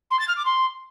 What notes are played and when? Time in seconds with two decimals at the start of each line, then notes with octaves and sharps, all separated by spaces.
0.10 C6
0.19 A6
0.28 F6
0.36 D6
0.45 C6